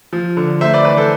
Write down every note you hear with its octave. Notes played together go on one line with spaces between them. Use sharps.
F3
D3
A3 C5 E5
B4 D5
E3 B4 D5
A4 C5